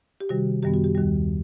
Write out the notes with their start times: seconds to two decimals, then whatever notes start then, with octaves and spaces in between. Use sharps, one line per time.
0.21 G4
0.29 C3 D#3 G3 F#4
0.63 F#2 D#3 G3 B3 G4
0.74 F#4
0.84 G4
0.95 D#2 D#3 G3